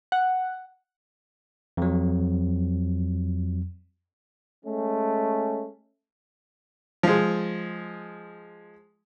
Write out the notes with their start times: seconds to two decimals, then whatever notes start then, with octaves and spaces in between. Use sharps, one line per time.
0.12 F#5
1.77 F2 F#3
4.64 G#3 A3 C#4
7.03 F3 G#3